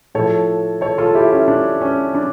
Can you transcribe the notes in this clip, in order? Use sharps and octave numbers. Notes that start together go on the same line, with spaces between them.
A2 F3 A4 C#5
A4 C#5
F4 A4
E4 G4
C#4 E4
D4
C#4
D4